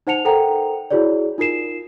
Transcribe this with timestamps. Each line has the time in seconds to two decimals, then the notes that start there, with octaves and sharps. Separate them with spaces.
0.07 D#4 C5 F#5 A5 C#7 F7
0.25 A4 A#4 C5 F#5 G5 A#5
0.91 E4 F#4 G#4 C#5 D5
1.38 D#4 F4 A#4 C7 E7